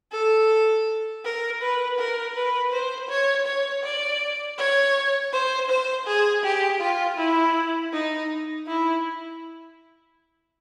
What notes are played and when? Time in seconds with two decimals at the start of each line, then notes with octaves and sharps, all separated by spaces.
0.12 A4
1.24 A#4
1.62 B4
1.99 A#4
2.35 B4
2.72 C5
3.09 C#5
3.46 C#5
3.83 D5
4.58 C#5
5.33 C5
5.69 C5
6.07 G#4
6.44 G4
6.81 F4
7.18 E4
7.93 D#4
8.67 E4